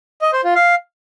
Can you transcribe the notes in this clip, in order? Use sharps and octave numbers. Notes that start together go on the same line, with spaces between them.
D#5
C5
F4
F5